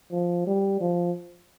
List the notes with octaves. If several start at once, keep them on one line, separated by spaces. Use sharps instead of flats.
F3
G3
F3